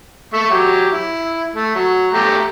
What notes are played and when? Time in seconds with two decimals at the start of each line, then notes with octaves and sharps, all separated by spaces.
0.33 A3 E5 C#6
0.50 F#3 G4
0.92 E4
1.54 A3
1.75 F#3
2.14 A3 G4 A#5